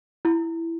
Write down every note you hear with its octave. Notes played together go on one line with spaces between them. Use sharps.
E4